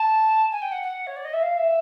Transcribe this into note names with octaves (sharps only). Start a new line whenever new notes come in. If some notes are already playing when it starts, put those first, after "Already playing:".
Already playing: A5
G#5
G5
F#5
F#5
C#5
D5
D#5
E5
F5
E5